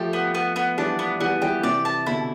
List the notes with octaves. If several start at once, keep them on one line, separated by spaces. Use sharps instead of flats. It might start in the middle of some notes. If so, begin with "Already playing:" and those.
Already playing: F3 A3 G4
B3
B3
B3
E3 G3 D4
B3
E3 G3 B3
E3 G3 G4
C3 E3 D5
A5
B2 D3 E4